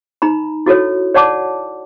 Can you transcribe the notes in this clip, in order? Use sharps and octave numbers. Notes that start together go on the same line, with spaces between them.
D#4 A#5 B5
E4 F#4 A4 C#5
C#5 D5 F#5 A5 D6